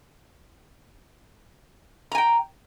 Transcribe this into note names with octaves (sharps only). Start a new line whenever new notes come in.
G5 G#5 A#5